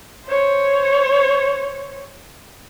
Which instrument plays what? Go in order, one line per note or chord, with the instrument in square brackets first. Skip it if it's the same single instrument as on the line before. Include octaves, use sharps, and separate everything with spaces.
[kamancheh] C5 C#5